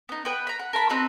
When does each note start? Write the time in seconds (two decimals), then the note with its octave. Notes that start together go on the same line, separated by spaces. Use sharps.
0.09 B3 D#4
0.25 B3 B4 G5
0.47 A#5 B5
0.59 F#5
0.73 A#4 A5 B5
0.89 C4 D#4 F#4 B4